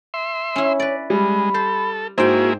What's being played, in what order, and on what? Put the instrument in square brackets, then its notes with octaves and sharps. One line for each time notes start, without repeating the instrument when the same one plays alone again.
[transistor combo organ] E5 C6
[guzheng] C#4 E4 [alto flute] C#5
[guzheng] B4 D5
[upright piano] G3 [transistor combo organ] G#3 [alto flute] B5
[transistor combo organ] A4 [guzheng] C5
[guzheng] G#2 G5 [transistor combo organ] A#3 E4 G#4 [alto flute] F#4 [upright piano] C5